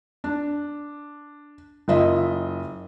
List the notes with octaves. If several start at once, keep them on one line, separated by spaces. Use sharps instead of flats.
D4
F#1 F4 D#5 E5